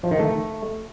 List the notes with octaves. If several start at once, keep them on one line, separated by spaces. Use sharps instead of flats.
F3
D#3
A3